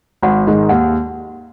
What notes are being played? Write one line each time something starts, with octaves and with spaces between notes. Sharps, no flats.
G#1 F#5
G#2 D#3 G#3
D#2 F#5